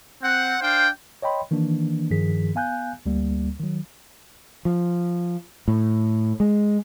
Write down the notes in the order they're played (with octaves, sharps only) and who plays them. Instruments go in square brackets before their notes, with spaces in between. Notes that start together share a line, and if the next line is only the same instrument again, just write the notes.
[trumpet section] C4 F#5
D4 C5 F5 G5
[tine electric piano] C#5 D#5 G5 B5 C6
D#3 E3 A#3 D4
G2 D#3 F3 G#4 B6
B3 F5 G#5 F#6 G6
D2 G3 A#3
D#3 F#3
[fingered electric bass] F3
A2
G#3